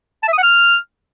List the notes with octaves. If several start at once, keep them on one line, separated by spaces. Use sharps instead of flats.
A5
E5
D#6
F#5
F6